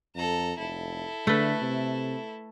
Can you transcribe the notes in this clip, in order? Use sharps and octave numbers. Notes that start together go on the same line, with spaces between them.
F2 A4 A#5
F1 E4 A4
D3 A3 B4
C3